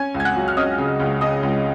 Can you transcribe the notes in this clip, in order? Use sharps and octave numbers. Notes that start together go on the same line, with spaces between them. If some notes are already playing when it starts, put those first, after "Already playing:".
Already playing: C#4 G#5 G#6
C#2
G#6
F#5 F#6
F#3
F6
C#4 D#5 D#6
C#3
C#2
C#3 D#5 D#6
C#2